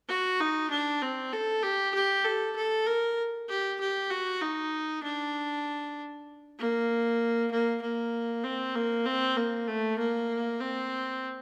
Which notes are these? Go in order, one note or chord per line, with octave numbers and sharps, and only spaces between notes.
F#4
D#4
D4
C4
A4
G4
G4
A4
A4
A#4
G4
G4
F#4
D#4
D4
A#3
A#3
A#3
C4
A#3
C4
A#3
A3
A#3
C4